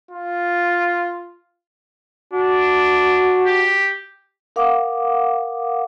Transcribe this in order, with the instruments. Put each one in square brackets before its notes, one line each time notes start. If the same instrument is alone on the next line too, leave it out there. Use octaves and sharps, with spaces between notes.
[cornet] F4
[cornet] D4 [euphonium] F#4
[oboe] G4
[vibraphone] A#4 F5 F#5 D6 D#6